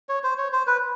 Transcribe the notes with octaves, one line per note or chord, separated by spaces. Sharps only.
C#5
C5
C#5
C5
B4